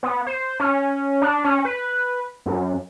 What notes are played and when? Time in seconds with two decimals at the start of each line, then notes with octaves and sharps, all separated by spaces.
0.03 B3
0.27 C5
0.60 C#4
1.22 D4
1.44 C#4
1.65 B4
2.46 F#2